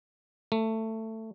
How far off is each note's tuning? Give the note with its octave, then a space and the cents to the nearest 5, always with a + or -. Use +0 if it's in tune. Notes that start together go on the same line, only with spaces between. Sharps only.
A3 +15